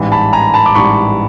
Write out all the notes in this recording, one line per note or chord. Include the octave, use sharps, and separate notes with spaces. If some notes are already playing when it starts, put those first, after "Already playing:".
Already playing: A1 G#2 E3 G3
A5 B5
G#5 A#5
A5 B5
D6
A1 G#2 E3 G3 B5 C#6